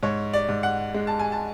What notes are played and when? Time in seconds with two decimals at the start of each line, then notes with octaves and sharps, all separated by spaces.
0.03 G#2 C#5
0.33 D5
0.49 G#2
0.63 F#5
0.94 G#3
1.07 A5
1.19 G#5
1.32 A5